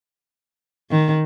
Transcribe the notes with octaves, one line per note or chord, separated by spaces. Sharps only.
D#3